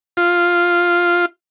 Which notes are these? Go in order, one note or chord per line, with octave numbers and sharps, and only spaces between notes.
F4